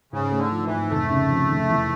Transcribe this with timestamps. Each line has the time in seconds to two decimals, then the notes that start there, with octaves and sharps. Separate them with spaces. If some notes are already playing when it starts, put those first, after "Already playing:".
0.13 G#2 C#3
0.31 A3
0.38 D3
0.51 F3
0.65 E3
0.70 G#2
0.90 F1 A3
1.11 C#3
1.30 F2
1.50 F1
1.69 E2